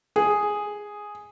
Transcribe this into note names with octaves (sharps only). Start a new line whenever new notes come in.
G#4